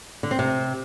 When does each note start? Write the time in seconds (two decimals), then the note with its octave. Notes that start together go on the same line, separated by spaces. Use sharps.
0.23 D3
0.31 C4
0.39 C3